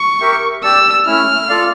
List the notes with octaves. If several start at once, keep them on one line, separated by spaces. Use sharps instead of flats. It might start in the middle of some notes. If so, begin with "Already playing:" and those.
Already playing: C#6
G4 A#4 E5 G5
G4 D5 A5 E6
A3 C#4 E4 F6
F4 A4 D5 F5